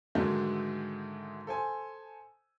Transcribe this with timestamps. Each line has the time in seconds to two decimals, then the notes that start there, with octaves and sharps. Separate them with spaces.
0.15 G#2 D3 D#3 F#3 G#3 A3
1.47 A4 C5 G#5